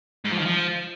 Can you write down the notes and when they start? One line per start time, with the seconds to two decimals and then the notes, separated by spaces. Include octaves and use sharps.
0.25 G#2
0.31 F3
0.38 D#3
0.45 F3